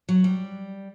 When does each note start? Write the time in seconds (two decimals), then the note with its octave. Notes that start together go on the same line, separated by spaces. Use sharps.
0.09 F#3
0.24 G3